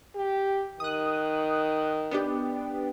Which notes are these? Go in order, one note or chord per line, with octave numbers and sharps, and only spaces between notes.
G4
D#3 D#6 F#6
B3 D4 G4